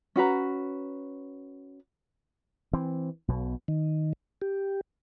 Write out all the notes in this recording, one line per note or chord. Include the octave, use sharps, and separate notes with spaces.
C#4 F#4 B4 A#5
E3 C4
B1 B2
D#3
G4